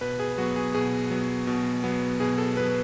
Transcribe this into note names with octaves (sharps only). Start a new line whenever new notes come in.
B2 B4
G#4
F#3 B3 F#4
G#4
B2 G#4
F#3 B3
B2
F#3 B3
B2 G#4
A4
F#3 B3 B4